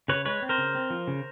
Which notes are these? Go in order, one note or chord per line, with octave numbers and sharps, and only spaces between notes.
C#3 B4 C#5
G#3 B4 C#5
C4
A#4 C5
C#3
C4
F3
C#3